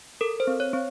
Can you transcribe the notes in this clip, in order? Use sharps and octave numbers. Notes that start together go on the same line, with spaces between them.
A4 A#4
C5
C4
C#5
C4